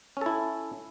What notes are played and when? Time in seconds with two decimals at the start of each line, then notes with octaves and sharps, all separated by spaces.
0.17 C#4
0.21 A4
0.26 E4